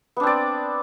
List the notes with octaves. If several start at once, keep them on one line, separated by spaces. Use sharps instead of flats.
B3 C4 D4 D5